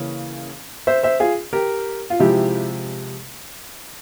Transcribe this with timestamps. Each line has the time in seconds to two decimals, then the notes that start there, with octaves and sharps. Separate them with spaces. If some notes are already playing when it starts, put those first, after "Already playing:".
Already playing: C#3 E3 A#3 C#4
0.87 C5 E5
1.03 C5 E5
1.20 F4 G#4
1.53 G4 A#4
2.10 F4
2.19 C3 F3 G#3 E4 G4